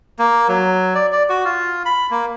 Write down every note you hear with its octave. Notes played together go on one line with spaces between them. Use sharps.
A#3
F#3
D5
D5
F#4
F4
B5
A#3